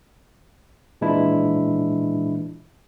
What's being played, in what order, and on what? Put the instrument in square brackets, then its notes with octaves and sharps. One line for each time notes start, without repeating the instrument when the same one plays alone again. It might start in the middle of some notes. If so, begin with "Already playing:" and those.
[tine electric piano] A#2 E3 G#3 D4 E4